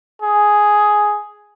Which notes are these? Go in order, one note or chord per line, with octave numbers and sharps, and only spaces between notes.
G#4